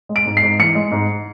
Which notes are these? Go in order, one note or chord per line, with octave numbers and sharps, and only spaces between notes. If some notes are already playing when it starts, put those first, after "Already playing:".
G#3
D7
G#2
C7
G#2
E3 C#7
G#3
G#2